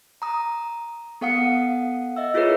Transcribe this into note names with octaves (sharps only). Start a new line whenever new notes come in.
A#5 D#6
B3 A4 F5 F#5 D#6 C#7
D#5 E5 E6
E4 F4 G#4 A#4 B4 C#5